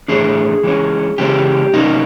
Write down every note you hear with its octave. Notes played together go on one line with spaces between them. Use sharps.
A2 E3 A3 D4 G#4
E3 G#3 C#4
C#3 E3 G#3 C#4 G4
C3 D#3 F#3 A#3 C#4 D#4